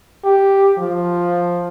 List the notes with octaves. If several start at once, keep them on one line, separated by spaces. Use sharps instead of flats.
G4
F3